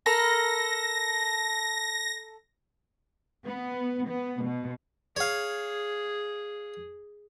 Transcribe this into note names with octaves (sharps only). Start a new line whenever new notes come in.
A4 A#4 B5 A#6
B3
B3
B2
G#4 C#5 F5